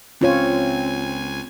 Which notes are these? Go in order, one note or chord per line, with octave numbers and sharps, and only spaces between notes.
C#2 C4 C#4 F4 C#5 G#5